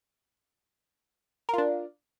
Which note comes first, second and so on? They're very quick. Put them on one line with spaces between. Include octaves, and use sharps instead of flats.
A#4 F4 D4